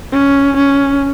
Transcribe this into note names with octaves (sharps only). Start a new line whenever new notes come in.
C#4
C#4